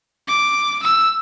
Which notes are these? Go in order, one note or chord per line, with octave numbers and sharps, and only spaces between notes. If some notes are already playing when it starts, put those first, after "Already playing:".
D6
E6